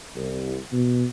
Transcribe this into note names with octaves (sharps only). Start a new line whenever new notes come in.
C2
B2